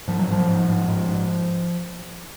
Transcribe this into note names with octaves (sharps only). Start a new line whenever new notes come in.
G#2 F3
F#3
G#2 F3
G#2
G#2
G#2
G#2